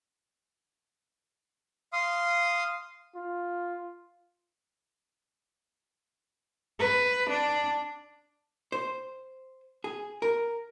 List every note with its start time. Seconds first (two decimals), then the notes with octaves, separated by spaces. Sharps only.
1.93 F5 C6 D#6
3.15 F4
6.80 B4
7.29 D4
8.72 C5
9.84 G#4
10.22 A#4